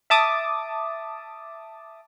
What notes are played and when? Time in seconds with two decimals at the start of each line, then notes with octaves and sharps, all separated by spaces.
0.10 E5 A5 D6 D#6